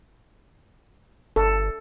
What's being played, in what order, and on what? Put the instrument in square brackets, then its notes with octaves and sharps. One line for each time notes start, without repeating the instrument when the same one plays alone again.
[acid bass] G1 [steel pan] A4